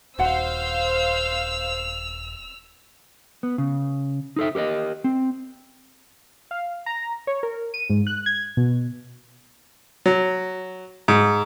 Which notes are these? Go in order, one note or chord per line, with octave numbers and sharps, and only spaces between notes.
D#1 F#4 C5 F5 F#5 E6 F7
B3
C#3
D#4 A4 E5
G4 A#4 C#5 D#5
C4
F5
A#5
C#5
A#4
D#7
G#2
F#6
G#6
B2
F#3
G#2